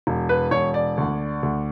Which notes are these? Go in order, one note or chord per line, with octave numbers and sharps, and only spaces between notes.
E1
B4
E1 C#5
D5
D2
D2